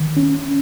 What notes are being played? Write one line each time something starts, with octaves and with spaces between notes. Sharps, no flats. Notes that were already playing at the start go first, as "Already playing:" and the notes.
Already playing: D#3
C#4